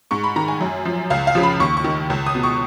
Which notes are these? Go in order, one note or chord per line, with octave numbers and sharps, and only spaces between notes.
G#2 C#6
B5
D#3 A#5
G#5
F#2
F3
C#2 F5
F5
C#3 F3
B5
D#2 C#6
C#6
D#3
C#2
D#6
B2
C#6